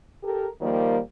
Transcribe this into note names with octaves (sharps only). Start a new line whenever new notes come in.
G4 A4 A#4
D#3 F3 G3 A#3